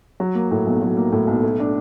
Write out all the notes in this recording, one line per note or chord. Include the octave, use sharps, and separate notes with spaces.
F#3
A#3
A2
B1
F#3
A#3
A2
B1
A3
D4